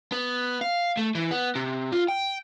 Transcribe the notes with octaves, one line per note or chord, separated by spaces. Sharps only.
B3
F5
A3
E3
B3
C3
F4
G5